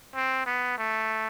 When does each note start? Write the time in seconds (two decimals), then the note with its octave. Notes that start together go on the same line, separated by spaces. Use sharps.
0.15 C4
0.46 B3
0.78 A3